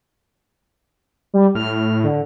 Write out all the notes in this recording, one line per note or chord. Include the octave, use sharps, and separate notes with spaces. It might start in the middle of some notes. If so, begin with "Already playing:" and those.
G3
A2 F6
D3